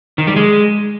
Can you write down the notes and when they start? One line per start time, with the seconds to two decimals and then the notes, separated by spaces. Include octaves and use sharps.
0.18 D#3
0.27 G3
0.36 G#3